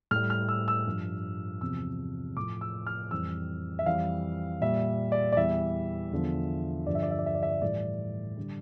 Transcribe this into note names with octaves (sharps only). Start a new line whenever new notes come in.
A2 G3 F6
F6
E6
E6
G2 F3
E2 C3 F3 E6
A2 F3 D6
E6
F6
F2 E3 G3 E6
E5
F2 E3 G3 F5
A#2 G3 E5
D5
D5
E2 E3 G3 E5
E2 D3 F3
G2 D3 F3 D5
E5
D5
E5
D5
E5
D5
E5
D5
A2 E3 G3 D5
D3 G3